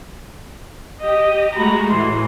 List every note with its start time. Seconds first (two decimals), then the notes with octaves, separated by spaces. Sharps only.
1.01 G4 D#5
1.53 G#3 A3 F#4 A#5 B5
1.90 A2 E3 C6